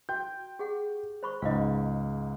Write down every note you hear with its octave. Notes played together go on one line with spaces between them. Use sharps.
F#4 G5 G6
G4 G#4 F#5
C5 B5 C#6
C#2 G#2 D#5 F5